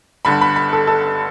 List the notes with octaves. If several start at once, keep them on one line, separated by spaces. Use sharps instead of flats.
G1 G2 D3 B5
B5
B5
A4
A4